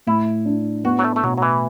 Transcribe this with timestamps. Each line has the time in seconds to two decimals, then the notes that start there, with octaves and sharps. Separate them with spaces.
0.07 A2 E4
0.45 D4
0.84 B3 F#4
0.99 F#3
1.04 A3
1.16 A3
1.23 B2 F#3
1.38 F#3
1.42 E3